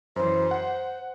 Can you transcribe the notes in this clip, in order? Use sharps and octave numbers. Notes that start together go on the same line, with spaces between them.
F#2 E3 C5
F#5